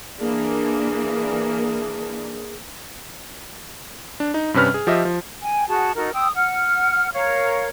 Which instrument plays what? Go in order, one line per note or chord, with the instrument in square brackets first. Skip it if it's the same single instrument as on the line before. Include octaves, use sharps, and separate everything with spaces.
[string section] E3 A#3 D4 [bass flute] G#4
[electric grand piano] D4
D#4
G2 C3 C#4 B4 F6
G#4
F3 G4 D#5 E5
F3
[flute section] G5 G#5
F#4 G#4 A5
D#4 F#4 A4 A#4
G5 C6 D#6 E6
F#5 F6
A#4 C#5 F5